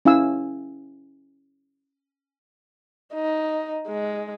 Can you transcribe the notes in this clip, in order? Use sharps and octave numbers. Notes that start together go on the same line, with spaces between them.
C#4 E4 F5 G#5 E6
D#4
G#3